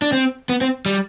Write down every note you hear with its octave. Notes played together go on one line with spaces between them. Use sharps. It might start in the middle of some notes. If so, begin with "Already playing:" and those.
D4
C4
B3
C4
G3